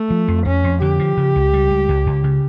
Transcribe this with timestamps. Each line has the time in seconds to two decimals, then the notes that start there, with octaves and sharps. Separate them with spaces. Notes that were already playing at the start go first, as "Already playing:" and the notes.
Already playing: A3
0.10 F3
0.28 F2
0.46 F2 C#4
0.64 F2
0.81 D3 G4
0.99 F3
1.17 C#3
1.36 C#2
1.53 G3
1.71 C#2
1.89 C#2
2.07 C#2
2.24 C#3